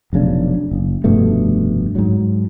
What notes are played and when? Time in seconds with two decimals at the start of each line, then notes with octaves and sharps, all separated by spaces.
0.13 F1 B1 C#3 D4
0.71 F#1
1.04 F1 G2 B2 A3
1.95 G#2 F#3